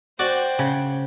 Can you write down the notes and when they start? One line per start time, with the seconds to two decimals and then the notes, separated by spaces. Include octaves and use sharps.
0.19 F#4 C5 D5 G5
0.59 C#3